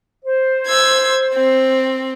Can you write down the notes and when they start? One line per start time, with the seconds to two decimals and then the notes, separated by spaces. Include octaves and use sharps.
0.24 C5
0.67 E6 G#6
1.34 C4